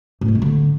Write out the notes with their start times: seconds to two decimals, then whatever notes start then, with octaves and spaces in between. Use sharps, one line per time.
0.21 A2
0.28 G#3
0.35 C#3
0.42 D3